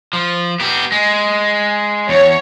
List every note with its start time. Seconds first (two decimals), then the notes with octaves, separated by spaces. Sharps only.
0.13 F3
0.60 B3 G4
0.92 G#3
2.09 E2 C#5